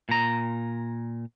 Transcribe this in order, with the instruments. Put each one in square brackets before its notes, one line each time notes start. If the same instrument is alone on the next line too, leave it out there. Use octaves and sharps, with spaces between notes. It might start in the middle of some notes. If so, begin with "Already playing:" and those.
[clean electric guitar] A#2 A#5